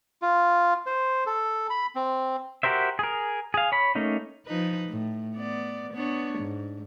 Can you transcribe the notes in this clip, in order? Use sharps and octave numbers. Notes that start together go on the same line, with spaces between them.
F4
C5
A4
B5
C4
F#4 G4 A#4 C5 E5
G#4 A#4
G#4 F5
C#5 B5
A3 A#3 C#4 D#4
F3 D#4 B4
A2
B3 D5
B3 D4 C#5
G#2